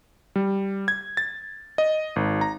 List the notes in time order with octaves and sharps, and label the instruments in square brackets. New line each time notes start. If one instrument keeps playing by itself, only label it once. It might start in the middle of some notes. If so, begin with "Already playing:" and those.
[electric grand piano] G3
G#6
A6
D#5
G#1
A#5